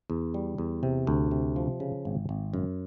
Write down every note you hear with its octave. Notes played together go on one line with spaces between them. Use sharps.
E2
G3
E2
C3
D2
C3
F3
C#3
G#1
G#1
F#2